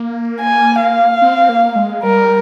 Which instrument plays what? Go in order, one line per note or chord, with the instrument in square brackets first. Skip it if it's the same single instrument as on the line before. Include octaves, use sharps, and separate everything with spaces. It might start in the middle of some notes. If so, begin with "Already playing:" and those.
Already playing: [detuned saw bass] A#3
[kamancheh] G#5
F5
[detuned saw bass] C4
A#3
G#3
[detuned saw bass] G3 [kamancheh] A#4